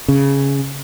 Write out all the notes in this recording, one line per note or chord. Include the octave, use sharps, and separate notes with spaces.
C#3